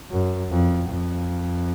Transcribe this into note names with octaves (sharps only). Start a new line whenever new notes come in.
F#2
F2
F2